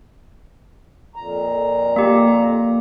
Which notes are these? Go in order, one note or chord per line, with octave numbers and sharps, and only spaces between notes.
F2 A#2 A#5
A#3 G4